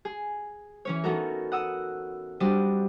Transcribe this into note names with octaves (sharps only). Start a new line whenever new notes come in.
G#4
E3 C#4 C#5
B3 C#4 D#4 F#4 A4 A#4
F#5 D#6 E6
G3 C4 D4 F#4 D5 D#5